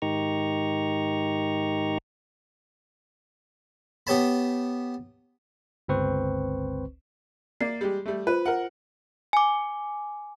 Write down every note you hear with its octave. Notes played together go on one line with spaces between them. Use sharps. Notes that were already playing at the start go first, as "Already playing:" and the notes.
G#2 D#3 D#4 G4 A#5 C#6
B3 G4 C#5 A5 B5
G1 C#2 C4 B4 C5 C#6
A#3 D5 C7
G3 G#3 G4
G3 A3
F4 B4 C5
A#4 F#5
G#5 D6